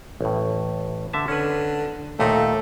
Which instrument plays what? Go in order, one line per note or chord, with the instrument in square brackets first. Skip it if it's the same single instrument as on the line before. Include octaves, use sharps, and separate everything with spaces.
[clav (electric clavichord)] A1 A2
D3 E5 A5
[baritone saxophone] D3 [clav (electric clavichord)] C#4 B4
[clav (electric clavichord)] D#2 A#2 D#4 [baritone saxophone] A3